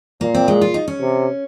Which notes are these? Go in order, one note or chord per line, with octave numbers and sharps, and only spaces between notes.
A#2 A#3
C4
G#3
F4
D#4
C#4
C3